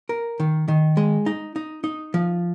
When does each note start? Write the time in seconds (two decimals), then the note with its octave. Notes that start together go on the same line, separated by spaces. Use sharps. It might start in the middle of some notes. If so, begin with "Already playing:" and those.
0.09 A#4
0.40 D#3
0.68 D#3
0.97 G#3
1.26 D#4
1.56 D#4
1.84 D#4
2.14 F3